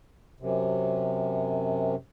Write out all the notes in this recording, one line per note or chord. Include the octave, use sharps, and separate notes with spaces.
F#2 C3